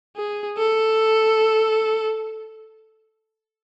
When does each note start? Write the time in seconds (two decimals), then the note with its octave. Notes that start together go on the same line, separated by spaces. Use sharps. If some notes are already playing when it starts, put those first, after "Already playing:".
0.16 G#4
0.58 A4